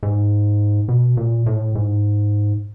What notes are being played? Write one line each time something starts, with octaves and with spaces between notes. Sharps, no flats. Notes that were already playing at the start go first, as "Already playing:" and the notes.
G#2
B2
A#2
A2
G#2